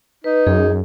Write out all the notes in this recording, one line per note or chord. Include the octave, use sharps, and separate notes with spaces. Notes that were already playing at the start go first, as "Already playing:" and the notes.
D#4 B4
F#2 G#4